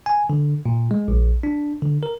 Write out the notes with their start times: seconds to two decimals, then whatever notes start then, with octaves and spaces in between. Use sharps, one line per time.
0.06 G#5
0.30 D3
0.66 A#2
0.91 G#3
1.08 A#1
1.43 D4
1.83 D3
2.03 A#4